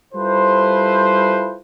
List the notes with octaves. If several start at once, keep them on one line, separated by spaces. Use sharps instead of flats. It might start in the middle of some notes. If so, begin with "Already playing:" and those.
G3 E4 F4 A4 B4 C5